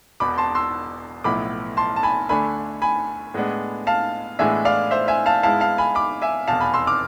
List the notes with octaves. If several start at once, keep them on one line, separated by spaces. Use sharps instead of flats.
E1 E2 B2 B5 D6
A5 C6
C6 E6
B1 A2 F3 B3 E4 B5 D6
A5 C6
A5
G#5 B5
D2 D3 A3 D4 G#5 B5
G#5 B5
A2 G#3 B3 D4
F5 A5
A2 E3 G#3 B3 D4 E5 G#5
D5 F5
C5 E5
E5 G#5
F5 A5
G#2 G#3 B3 E4 F5 A5
F5 A5
G#5 B5
B5 D6
E5 G#5
F1 E2 B2 F5 A5
G#5 B5
C6 E6
D6 F6